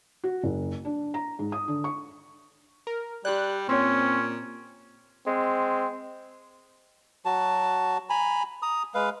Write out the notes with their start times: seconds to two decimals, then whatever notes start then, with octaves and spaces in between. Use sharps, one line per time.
0.24 F#4
0.43 F#1
0.85 D4
1.14 A#5
1.39 G#2
1.52 D#6
1.68 D3
1.84 C#6
2.87 A#4
3.25 G3 G4 D5 F#6
3.69 A#2 C4 C#4 C#5 C6
5.26 G#3 C4
7.25 F#3 F#4 A5
8.10 G#5 A#5 B5
8.62 A#5 D#6
8.94 G#3 B4 F5